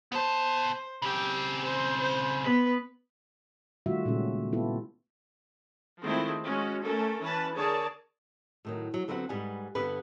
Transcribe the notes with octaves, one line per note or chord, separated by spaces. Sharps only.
B3 C5 A5
C#3 C4 G4
C5
C5
B3 B4
D#3 G3 A3 F4 F#4 E5
A#2 C#3 G#3 C#4 A4
B3 E4 F4 G4 A4
D#3 F3 G#3 A3 C4 E4
G#3 C#4 F#4
A3 C#4 A4 A#4
E3 C#4 B4 A5
D3 G#4 A#4 C#5 D5 A5
A2 D#3 F#3
F#3
D3 F#3 B3 C4 F5 F#5
G#2 G3 B4 F#5 G#5
G2 D3 G3 B3 G4 B4